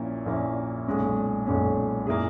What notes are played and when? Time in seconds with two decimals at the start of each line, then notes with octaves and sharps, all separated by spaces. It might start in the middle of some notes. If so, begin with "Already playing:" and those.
Already playing: A#1 A#2 A#3 C#4 E4
0.26 A#1 A#2 A#3 C#4 E4
0.87 B1 A#2 G#3 C#4
1.47 B1 A#2 G#3 C#4
2.07 A#2 A#3 E4 G#4